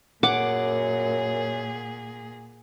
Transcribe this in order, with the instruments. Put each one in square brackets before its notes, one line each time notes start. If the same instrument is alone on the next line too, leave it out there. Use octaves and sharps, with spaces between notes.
[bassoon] F#2 [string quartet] A#2 G#4 [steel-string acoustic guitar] F#5 [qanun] D6